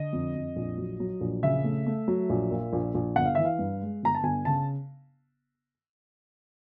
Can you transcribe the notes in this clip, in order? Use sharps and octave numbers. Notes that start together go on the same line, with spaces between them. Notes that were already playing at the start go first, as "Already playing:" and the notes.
Already playing: D3 D#5
F2
F2
A#1
F#3
F#3
A#1
C#3 E5
A3
A3
F#3
A#1
A#2
A#1
A#1
G1 F#5
F5
E3 E5
F5
G2
G#3
G1 A#5
A5
G1 G#5
C#3 A5